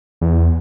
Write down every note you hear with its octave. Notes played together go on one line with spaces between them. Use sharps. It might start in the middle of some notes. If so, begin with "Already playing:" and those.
E2